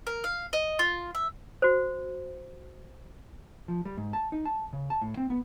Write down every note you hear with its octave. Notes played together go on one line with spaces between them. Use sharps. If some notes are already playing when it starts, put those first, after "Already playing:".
A#4
F5
D#5
F4
E5
F#4 C5
F3
G3
G#2
A5
D#4
A5
C#3
A5
A2
C4
B3